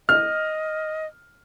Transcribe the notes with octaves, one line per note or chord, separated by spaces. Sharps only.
D#5 F6